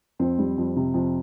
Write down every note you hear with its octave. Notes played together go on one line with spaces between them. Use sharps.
F2 C4
G3
F2
C3
F2